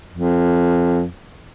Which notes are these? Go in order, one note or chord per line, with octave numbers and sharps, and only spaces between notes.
F2